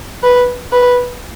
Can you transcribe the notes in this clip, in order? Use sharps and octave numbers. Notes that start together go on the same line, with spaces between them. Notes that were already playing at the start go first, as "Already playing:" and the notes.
B4
B4